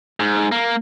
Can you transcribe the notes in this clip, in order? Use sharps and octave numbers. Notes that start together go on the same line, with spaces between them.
G#2
A#3